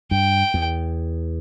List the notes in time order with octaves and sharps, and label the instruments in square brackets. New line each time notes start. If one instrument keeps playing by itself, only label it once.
[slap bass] G2 [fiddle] G5
[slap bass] E2